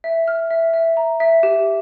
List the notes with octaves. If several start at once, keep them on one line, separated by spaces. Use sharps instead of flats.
E5
F6
E5
E5
A#5
E5
G4